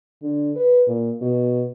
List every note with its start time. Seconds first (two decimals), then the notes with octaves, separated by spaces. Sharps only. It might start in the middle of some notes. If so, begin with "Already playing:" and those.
0.22 D3
0.56 B4
0.87 A#2
1.21 B2